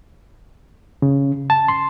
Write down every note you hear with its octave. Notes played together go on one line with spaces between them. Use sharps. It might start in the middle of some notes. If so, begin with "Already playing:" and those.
C#3
A5
C6